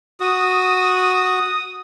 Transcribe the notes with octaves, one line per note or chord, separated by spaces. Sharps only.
F#4 D#6